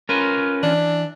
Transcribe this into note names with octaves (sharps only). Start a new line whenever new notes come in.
C#4 F4 A#4 B4
E3 D4